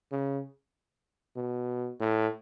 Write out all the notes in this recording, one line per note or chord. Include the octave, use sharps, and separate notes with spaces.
C#3
B2
A2